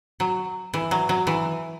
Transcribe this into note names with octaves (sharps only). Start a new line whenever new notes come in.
F#3
E3
F#3
F#3
E3